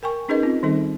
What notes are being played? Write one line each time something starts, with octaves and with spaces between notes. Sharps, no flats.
A#4 G5 G#5 C#6
C#4 D#4 G#4 A#4 B4 D#5
C4 F4
D#3 G3 C4 D#4 A4